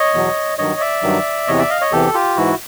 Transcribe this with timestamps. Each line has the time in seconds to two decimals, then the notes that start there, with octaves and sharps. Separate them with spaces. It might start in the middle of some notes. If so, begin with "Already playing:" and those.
Already playing: C#5 D#5
0.14 E2 B2 F#3
0.58 G2 D#3 F#3 C#5 D#5
0.80 D5 E5
1.03 G2 D#3 F#3
1.48 E2 C3 E3 C#5 D#5
1.58 D5 E5
1.70 D#5 F5
1.81 C#5 D#5
1.92 E2 C3 E3 G4 A4
2.14 F4 G4
2.37 G#2 E3 E4 F#4